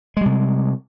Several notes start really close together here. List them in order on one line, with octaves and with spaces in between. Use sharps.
G#3 G3 C3